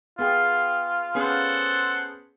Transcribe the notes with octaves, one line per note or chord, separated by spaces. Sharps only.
B3 F4 G#4 G5
B3 C#4 G#4 A4 C5 F#5